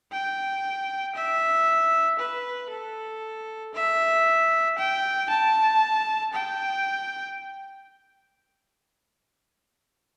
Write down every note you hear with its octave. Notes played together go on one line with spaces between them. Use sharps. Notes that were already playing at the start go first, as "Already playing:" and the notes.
G5
E5
B4
A4
E5
G5
A5
G5